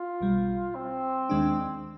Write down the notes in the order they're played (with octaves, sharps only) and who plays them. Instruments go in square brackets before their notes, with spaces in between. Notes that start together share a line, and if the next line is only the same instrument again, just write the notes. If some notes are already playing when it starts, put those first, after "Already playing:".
Already playing: [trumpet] F4
[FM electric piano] B1 B2 G3
[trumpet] C4
[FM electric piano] D#2 D#3 G#3 D4